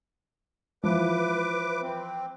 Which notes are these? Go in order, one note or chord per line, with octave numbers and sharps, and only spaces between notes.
E3 F3 B4 D6
C4